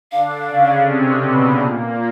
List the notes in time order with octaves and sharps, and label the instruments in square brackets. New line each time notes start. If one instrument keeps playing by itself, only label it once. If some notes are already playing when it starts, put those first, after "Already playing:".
[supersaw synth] D3 D4 [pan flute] F5
[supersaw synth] C#3 C#4
C3 C4
B2 B3
A#2 A#3